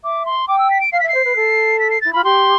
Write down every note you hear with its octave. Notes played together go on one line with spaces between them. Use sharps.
E5 D6
C6
G5 D6
E6
B6
D7
F5 C7
E5 B6
C7
C5
B4
A4
B6
C7
E4 A6
F4 B5
G4 C6